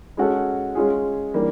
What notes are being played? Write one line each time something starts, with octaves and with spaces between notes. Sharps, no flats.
G#3 C#4 F#4 A4
G#3 C#4 F4 G#4
E3 G3 A#3 D4